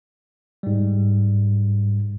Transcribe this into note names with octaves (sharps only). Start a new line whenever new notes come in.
G#2 G3